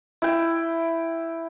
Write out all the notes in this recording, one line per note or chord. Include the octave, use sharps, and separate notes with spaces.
E4 G5